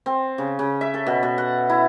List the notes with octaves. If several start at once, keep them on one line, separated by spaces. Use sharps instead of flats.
C4
C#3
C#3
E5
A4
B2
B2
F#5
E4